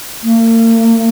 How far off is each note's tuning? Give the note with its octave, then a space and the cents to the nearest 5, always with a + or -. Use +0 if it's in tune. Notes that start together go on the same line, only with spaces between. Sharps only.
A#3 -45